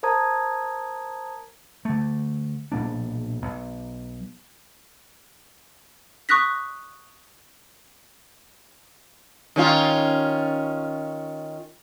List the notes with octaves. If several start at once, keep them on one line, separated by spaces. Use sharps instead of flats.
A#4 C5 A5 A#5 D#6 G#6
D3 A3
B1 A#2 A#3 D4
B1
C#6 D#6 F#6 A#6 B6
D#3 C#4 F4